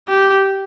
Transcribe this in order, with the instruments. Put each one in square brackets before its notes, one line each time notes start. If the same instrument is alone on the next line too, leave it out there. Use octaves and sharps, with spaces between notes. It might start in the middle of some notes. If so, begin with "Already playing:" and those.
[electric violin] G4